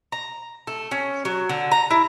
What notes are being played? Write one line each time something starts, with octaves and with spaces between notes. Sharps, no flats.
A#5
A3
C#4
F#3
D3
A#5
E4